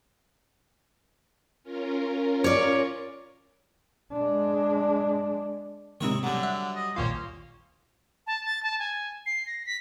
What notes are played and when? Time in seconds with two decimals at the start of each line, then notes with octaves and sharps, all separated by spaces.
1.63 C#4 F4 A#4
2.44 C#5 D5
4.13 G#3 D4
6.01 D#2 G#2 C3 D#4 E4 C#5
6.23 D3 F#3 G3
6.43 E5 F#5
6.76 D#5
6.96 A#1 D#2 A#3 C#4 F4 C5
8.27 A5
8.45 A6
8.63 A5
8.79 G#5
9.26 C7
9.47 A#6
9.66 B6